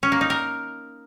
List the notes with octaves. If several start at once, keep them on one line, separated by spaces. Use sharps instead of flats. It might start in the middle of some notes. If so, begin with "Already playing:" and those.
C#4
A#3
D#4
A#4